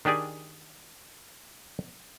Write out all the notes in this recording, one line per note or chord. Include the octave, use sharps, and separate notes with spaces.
D#3 D4 G4 G#4 D5